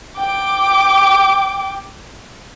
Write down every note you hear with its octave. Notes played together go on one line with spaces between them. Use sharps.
G5 D6